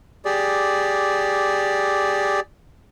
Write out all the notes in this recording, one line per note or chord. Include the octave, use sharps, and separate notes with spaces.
G4 G#4 D5